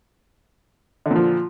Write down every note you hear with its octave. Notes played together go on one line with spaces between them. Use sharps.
A#2 D3 F3